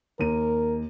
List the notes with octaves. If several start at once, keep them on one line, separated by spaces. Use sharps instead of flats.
D#2 A#4 D#7